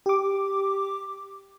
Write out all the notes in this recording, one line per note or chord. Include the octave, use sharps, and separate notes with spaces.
G4 D6